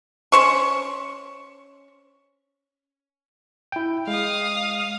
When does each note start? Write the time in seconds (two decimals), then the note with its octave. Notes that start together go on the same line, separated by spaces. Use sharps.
0.32 C#4 C5 C#6
3.72 E4 G5
4.07 G#3 F5 D#6